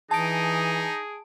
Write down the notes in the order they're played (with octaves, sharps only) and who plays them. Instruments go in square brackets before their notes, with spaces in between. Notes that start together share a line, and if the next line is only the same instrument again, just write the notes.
[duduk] E3 [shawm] D#4 [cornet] G#4 [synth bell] A5 D7